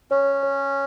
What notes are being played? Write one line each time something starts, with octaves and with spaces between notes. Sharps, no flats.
C#4 C#5
C#5